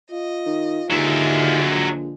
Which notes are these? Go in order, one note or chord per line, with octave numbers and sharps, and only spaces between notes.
F4 D#5
D#3
D#2 D3 F#3 G#3 E5
A#1